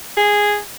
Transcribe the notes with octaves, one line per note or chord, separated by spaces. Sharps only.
G#4